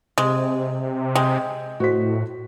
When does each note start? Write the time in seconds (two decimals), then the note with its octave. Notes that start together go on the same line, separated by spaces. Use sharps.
0.18 C3 G#3
1.15 G#3 G5
1.80 A2 F#4 C5 B6